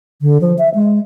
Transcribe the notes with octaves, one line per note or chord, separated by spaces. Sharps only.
D3
F3
E5
G#3